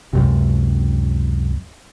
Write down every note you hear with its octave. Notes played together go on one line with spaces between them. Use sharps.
C#2 F#2 C3